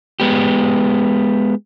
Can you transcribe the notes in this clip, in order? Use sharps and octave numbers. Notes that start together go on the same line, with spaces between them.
G#3 B3 G4